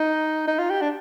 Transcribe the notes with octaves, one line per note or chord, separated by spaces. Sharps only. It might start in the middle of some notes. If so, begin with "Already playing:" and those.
Already playing: D#4
D#4
F4
G4
D4